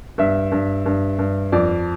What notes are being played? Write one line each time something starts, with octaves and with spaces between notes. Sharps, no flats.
G2 E5
G2
G2
G2
F2 D5